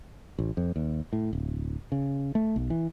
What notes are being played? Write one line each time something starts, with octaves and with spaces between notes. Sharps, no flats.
A1
F2
D#2
A2
D1
C#3
A3
B1
E3